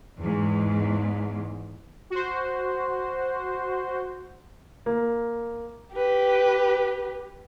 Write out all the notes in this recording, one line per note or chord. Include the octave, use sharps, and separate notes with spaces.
E2 G#2
F#4 C5
A#3
G4 B4